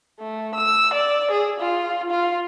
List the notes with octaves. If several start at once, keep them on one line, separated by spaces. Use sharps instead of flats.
A3
E6
D5
G#4
F4
F4